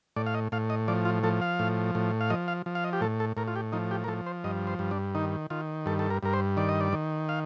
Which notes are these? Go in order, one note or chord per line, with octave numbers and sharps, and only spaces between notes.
A2 D5
F5
D#5
A2 F5
D#5
F3 D5
F4
F3 A4
F5
A2
A2
F5
F3 D#5
F5
F3
F5
D#5
G4
A2 A4
A4
A2 A#4
F4
G4
F3 D#4
G4
A#4
F3 A4
C5
G2 D#5
C5
G2
D4
D#3 D#4
D#3 F4
G2 A4
A4
A#4
G2 A#4
C5
D#3 D5
D#5
D5
D#3
F5